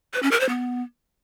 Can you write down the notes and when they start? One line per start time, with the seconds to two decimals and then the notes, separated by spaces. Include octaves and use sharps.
0.14 B4
0.23 C#4
0.31 A#4
0.40 C5
0.49 B3